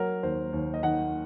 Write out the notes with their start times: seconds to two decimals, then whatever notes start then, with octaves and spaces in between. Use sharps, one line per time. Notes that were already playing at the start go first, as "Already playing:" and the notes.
Already playing: F#3 A#4
0.23 D#2 C5
0.52 D#2
0.74 D#5
0.83 D#3 F#5